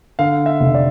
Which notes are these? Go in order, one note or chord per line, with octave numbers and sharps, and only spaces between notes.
D3 F5
E5
F1
D5